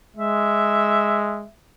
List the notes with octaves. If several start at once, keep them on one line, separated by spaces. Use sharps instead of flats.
G#3 E5